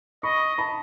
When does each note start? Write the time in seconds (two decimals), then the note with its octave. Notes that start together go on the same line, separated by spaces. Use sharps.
0.23 D#5 B5 C#6
0.58 A5 B5